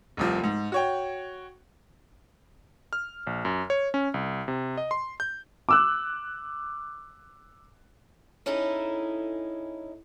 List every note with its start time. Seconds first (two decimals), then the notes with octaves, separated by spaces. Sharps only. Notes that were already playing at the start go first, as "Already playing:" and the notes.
0.17 F1 C2 F3
0.44 G#2
0.72 F#4 C#5 G5
2.93 F6
3.27 A#1
3.45 F#2
3.70 C#5
3.94 C#4
4.14 C2
4.48 C3
4.77 D#5
4.91 C6
5.20 G6
5.69 D6 E6 F#6
8.46 C#4 D#4 E4 G#4 A4